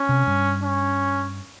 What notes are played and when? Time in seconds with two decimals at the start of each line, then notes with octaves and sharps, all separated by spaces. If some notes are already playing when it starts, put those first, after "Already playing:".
Already playing: C#4
0.09 C3
0.27 G2
0.63 C#4